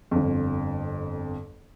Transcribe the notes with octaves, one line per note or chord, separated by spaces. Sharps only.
G1 F2